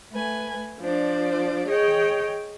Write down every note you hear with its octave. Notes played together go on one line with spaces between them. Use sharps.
A3 B4 G#5
F3 D4 C5 D5
G#4 C#5 D#5 G5